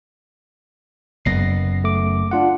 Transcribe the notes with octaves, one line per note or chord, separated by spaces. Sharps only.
F#1 F#2 B3 A#6 C7
A3 D6
D4 F4 F#5